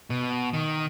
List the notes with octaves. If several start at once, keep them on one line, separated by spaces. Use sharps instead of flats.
B2
D#3